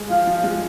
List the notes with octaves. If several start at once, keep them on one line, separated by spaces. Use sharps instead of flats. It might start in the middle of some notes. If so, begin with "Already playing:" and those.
Already playing: G#3
F3 F5
F3
G#3